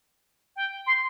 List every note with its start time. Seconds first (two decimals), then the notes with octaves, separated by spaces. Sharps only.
0.56 G5
0.87 C6